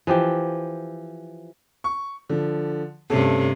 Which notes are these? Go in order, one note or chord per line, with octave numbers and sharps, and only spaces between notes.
E3 F3 G4 G5
C#6
D3 F3
G2 C3 A3 C#4 A4